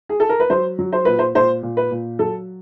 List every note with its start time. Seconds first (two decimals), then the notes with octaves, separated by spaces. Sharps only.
0.09 G#4
0.20 A4
0.29 A#4
0.40 B4
0.50 F#3 C5
0.79 F#3
0.93 C5
1.05 A#2 B4
1.19 C5
1.35 A#2 C5
1.63 A#2
1.77 B4
1.91 A#2
2.19 F#3 A4